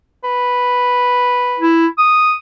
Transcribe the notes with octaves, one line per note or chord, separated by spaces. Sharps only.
B4
E4
D#6